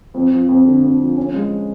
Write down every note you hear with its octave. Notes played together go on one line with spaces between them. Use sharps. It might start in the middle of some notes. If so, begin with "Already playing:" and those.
F2
F3
F2
D3
F2
F3
C#4
G#3